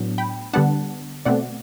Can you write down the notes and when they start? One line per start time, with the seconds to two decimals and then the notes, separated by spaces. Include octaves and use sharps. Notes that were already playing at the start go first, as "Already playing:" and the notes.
Already playing: A2 F#3 B3 D4
0.18 G5 B5
0.53 D3 G3 B3 D4 F#5 A5
1.25 B2 A3 C4 D5 F#5